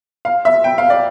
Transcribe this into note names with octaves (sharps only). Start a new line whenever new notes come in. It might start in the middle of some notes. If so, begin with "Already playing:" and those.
F5
E5
G5
F5
D5